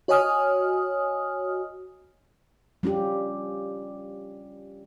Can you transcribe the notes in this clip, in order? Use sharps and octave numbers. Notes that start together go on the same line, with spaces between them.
F#4 C#5 D#5 G#5 D#6 F6
G3 C#4 F4 G4